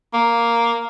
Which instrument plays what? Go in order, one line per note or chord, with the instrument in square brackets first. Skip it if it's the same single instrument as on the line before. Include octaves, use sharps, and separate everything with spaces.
[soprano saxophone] A#3